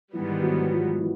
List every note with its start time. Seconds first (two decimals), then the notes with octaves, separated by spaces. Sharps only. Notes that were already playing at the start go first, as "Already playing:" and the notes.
0.13 G#2 D#3 E3 G3 B3 E4
0.42 F#3 F#4
0.71 F3 F4
1.00 E3